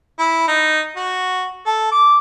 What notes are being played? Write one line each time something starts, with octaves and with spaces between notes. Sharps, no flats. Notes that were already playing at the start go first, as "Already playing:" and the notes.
E4
D#4
F#4
A4
D6